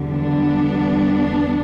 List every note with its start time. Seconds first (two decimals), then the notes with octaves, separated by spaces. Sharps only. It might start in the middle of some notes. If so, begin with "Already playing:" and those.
Already playing: E2 D3 G3
0.09 B3 D4